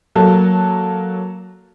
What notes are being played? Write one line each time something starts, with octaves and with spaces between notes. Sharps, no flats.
F#3 A#3 A4